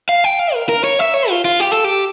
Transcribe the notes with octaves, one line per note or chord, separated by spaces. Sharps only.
F5
G5
F5
A#4
A#4
C#5
E5
C#5
F4
F4
G4
A4
G4